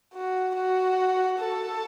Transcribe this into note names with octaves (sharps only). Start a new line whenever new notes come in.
F#4
F#4
A4